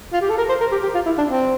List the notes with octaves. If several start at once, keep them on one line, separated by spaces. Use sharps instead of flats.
F4
G4
A4
A#4
C5
A#4
G4
G4
F4
E4
D4
C4